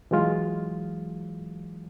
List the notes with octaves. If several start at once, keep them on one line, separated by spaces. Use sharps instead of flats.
E3 F#3 G#3 F4